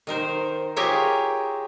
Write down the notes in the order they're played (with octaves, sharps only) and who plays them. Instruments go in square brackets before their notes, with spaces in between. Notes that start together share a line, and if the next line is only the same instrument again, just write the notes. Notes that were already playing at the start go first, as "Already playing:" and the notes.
[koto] D#3 A#4 C5
F4 G4 G#4 A#4 C#5 E5